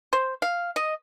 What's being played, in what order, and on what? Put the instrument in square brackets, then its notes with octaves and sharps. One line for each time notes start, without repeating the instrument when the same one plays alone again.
[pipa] C5
F5
D#5